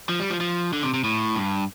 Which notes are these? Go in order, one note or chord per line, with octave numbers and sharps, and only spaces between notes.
F3
G3
F3
F3
D3
C3
C3
A2
G2